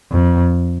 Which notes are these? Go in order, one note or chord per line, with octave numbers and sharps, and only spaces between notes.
F2